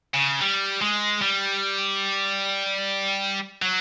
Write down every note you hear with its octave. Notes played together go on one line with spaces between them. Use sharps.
C#3
G3
G#3
G3
F#3